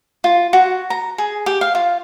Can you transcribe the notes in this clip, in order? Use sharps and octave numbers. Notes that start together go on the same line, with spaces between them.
F4
F#4
A#5
G#4
G4
F5
F4